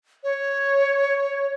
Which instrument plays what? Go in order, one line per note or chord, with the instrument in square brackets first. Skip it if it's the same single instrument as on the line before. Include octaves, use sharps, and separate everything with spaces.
[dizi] C#5